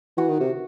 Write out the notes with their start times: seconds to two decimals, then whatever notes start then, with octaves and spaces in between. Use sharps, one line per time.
0.17 E3 F#4
0.29 D#3
0.40 C3